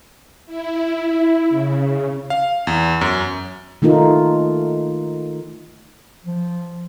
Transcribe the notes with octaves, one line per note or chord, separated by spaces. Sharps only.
E4
C#3
F5
E2
F#2
D#3 A3 D#4 F4 A#4
F3